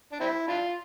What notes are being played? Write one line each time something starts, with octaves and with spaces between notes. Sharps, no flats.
D4
C4 E4
D4 F4